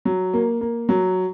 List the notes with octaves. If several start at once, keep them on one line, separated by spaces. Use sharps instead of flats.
F#3
A#3
A#3
F#3